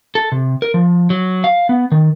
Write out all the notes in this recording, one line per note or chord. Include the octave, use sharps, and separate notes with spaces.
A4
C3
A#4
F3
F#3
F5
B3
D#3